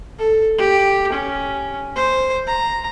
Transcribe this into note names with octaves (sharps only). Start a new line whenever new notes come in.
A4
G4
C#4
C5
A#5